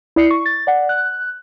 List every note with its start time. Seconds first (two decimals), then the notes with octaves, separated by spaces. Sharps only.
0.16 E4 D5 C7 C#7
0.31 C#6
0.46 A6
0.67 D5 F#5
0.89 F#6